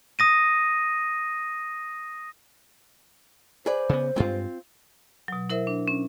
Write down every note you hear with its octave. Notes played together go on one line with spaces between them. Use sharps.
D#6 A#6 D#7
G#4 B4 C5 D5
C#3 B3
G2 G#3 C4 F4
B2 F#3
E4 A#4 C5 E5
D4
C#4